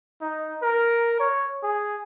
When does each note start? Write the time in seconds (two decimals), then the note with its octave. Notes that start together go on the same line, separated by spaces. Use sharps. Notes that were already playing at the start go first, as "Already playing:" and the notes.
0.21 D#4
0.62 A#4
1.20 C#5
1.63 G#4